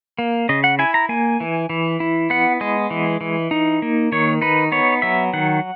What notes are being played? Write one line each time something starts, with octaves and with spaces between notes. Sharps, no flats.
A#3
C#3 D#5
F#5
E4 G#5
A#5
A#3 G#5
E3
E3
E4
B3 F#5
G#3 D#5
E3
E3
D#4
A#3
D#3 C#5
D#4 B4
B3 C#5
F#3 E5
D#3 F#5